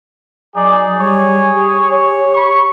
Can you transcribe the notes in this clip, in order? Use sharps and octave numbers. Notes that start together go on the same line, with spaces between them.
F#3 D#4 G#4 D5
G3 G#4 C#5
G4
C#5
B5 C#6